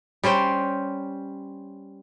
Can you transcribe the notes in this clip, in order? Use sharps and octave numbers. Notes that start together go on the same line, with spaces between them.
G3 C#4 C5 G5